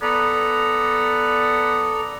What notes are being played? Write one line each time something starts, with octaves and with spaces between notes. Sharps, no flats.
B3 A4 D5 A#5